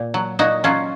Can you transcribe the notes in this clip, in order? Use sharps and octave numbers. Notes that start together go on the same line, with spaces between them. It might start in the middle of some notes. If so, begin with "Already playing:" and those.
Already playing: A#2
F#3
A#2 D#4 F#4
F#3 C#4 F4